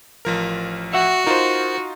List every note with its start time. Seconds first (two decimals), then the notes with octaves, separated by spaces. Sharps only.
0.25 A1 F3 A#4
0.93 F#4 E5 F#5
1.27 D#4 F4 A#4 C5